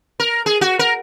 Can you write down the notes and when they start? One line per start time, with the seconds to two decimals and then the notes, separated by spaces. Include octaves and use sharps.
0.20 A#4
0.46 G#4
0.61 F#4
0.79 A#4